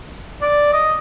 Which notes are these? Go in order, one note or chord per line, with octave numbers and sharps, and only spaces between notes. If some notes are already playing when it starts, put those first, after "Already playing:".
D5
D#5